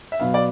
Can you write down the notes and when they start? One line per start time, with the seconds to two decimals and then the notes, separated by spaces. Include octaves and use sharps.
0.12 E5
0.20 B2 F#3 B3 F5
0.34 D5